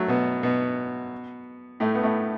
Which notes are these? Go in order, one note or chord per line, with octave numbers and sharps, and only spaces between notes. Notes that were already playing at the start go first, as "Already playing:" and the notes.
Already playing: F#3 A3
B2 B3
B2 B3
A2 A3
B3
A2 A3